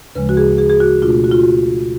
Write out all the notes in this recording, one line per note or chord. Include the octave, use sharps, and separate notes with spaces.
D2 C#3 F3 G#3 B4
F#4
G#4
G#4
G#4
F#4
B2 A3 D4 F4
F#4
F4
F#4